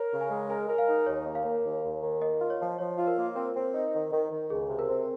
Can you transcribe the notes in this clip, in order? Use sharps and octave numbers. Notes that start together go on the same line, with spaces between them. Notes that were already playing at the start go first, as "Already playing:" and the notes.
Already playing: A#4 C#5
C#3
G#5
G#3
A#4 G#5
A#4
F5
D#4
D#2 C#5
A#3
F5
A#3
D#2
D#2
D#3
A#3 D#5
F4
C#5
F3
F3 C#5
F4
A#4
A#3
C4 A#4
C4
D#4
D#3
D#3
D#3
C#2 G#4
C3
A#4
C4